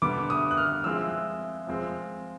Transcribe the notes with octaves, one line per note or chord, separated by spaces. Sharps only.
D3 G3 B3 D6
D#6
F#6
F6
F3 G#3 C4 E4 E6
F3 G#3 C4